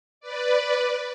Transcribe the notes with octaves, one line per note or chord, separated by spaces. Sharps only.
B4 D5